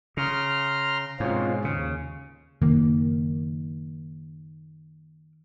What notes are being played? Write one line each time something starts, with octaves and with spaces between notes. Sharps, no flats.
C#3 A#5 C6 F6
G#2 B2 C4 C#4 F4
D#2 C#3
F#1 D#3 A#3